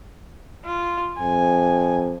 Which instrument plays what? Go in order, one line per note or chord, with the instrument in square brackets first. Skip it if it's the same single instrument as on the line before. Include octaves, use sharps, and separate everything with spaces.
[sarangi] F4
[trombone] F2 [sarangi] G#5